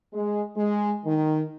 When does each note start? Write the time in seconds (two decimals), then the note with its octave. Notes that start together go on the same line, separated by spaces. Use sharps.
0.13 G#3
0.55 G#3
1.05 D#3